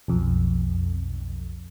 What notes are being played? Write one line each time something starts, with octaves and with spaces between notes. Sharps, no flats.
B1 F2